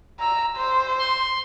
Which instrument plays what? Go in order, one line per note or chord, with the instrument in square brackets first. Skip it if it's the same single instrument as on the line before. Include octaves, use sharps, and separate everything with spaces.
[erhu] A#5 [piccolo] E6
[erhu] C5
[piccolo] C6